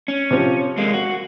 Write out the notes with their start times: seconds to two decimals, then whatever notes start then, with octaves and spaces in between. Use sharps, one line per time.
0.08 C#4
0.31 C3 F3
0.78 G#3 A#3
0.93 F#4